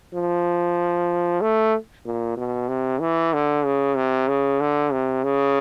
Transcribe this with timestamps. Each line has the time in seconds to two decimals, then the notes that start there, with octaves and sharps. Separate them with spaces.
0.14 F3
1.41 A3
2.05 A#2
2.37 B2
2.69 C3
3.01 E3
3.33 D3
3.65 C#3
3.96 C3
4.28 C#3
4.60 D3
4.92 C3
5.24 C#3